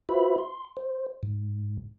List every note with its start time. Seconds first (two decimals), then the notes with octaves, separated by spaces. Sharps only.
0.09 F4 F#4 B4 C5 E5 B5
0.38 C6
0.77 C5
1.23 G#2